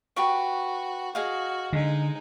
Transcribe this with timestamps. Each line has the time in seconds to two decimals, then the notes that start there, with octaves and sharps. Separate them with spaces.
0.16 F#4 G4 B4 C#6
1.15 F#4 G#4 D#5 F5
1.73 D3 G#3 D#4